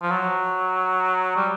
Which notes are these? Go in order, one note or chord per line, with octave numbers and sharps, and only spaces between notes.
F3
F#3
G3